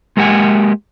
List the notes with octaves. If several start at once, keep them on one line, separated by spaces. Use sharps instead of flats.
G#3 A#3 G4 F#5 G#5